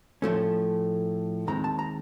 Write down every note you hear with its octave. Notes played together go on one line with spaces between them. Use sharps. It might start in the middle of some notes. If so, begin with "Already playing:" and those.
A2 F3 A3 C#4
D#2 D#3 G#3 C4 A#5
A5
A#5